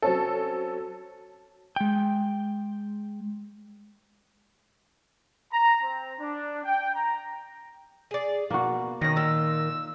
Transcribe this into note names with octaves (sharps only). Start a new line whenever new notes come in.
F#3 C4 C#4 A4
G#3 G5
A#5
C4
D4
G5
A#5
G#4 D5
B2 A#3 F#4
B2 D#3 C#4 A#6
A#2 F4 E6